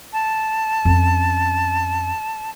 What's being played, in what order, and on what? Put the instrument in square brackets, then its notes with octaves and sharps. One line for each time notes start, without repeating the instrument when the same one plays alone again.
[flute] A5
[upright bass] F2 C#4